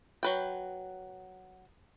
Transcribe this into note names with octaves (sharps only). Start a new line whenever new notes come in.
F#3 B4 G5